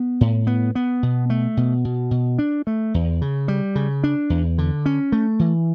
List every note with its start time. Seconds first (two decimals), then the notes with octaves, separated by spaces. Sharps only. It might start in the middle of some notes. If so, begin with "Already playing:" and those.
Already playing: B3
0.21 A2
0.47 B3
0.75 B3
1.03 B2
1.30 A3
1.57 B2
1.85 B2
2.11 B2
2.39 D4
2.67 A3
2.94 E2
3.22 C#3
3.48 G3
3.75 C#3
4.04 D4
4.30 E2
4.58 D3
4.86 C#4
5.12 A3
5.39 E3